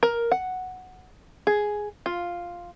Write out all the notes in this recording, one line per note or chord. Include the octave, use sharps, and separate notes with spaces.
A#4
F#5
G#4
F4